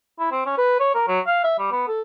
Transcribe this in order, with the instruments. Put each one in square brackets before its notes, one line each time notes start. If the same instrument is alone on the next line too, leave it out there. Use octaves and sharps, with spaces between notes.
[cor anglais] E4
C4
C#4
B4
C#5
A#4
F#3
F5
E5
G3
B3
A4